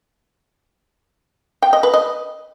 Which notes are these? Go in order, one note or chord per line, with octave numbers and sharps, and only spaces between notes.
G5
D#5
B4
D#5